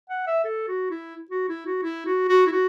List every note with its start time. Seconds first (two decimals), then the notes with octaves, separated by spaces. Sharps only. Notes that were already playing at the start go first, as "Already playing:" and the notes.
0.10 F#5
0.27 E5
0.44 A4
0.68 F#4
0.91 E4
1.31 F#4
1.49 E4
1.66 F#4
1.83 E4
2.06 F#4
2.29 F#4
2.46 E4
2.52 F#4